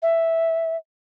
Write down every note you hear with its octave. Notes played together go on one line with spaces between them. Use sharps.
E5